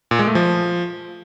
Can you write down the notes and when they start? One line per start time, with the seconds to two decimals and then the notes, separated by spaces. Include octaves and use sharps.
0.11 A#2
0.19 G#3
0.27 A3
0.35 F3